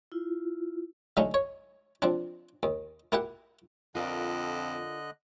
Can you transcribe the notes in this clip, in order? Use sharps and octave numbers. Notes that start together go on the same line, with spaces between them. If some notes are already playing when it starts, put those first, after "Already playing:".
E4 F4
D3 F#3 A3 C#4 D#4
C#5
F3 C4 D4
D#2
A#3 E4 G4 F#5
F2 D3 F4 A#4 D5 D#5 F#6